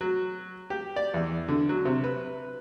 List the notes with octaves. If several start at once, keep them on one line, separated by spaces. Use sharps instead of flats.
F#3
G4
D5
E2
D3
F#3
C3
B4